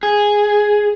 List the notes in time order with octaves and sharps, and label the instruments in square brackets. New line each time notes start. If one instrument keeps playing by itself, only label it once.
[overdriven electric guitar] G#4